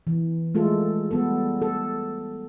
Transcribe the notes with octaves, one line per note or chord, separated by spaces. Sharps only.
E3
G#3 A3 F4 A4
G3 B3 A4
A4